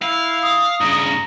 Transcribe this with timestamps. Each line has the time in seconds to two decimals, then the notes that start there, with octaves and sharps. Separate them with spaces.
0.02 E4 F5
0.42 D#6
0.81 G2 C#3 A#5